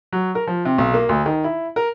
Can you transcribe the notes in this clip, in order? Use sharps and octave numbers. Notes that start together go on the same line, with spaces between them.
F#3
A#4
F3
C3
B1
A#3
D2
D#3
E4
A#4